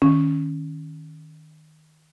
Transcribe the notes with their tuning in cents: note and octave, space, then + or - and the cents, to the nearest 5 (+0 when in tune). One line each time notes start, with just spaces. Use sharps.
D#3 +0 C#4 +0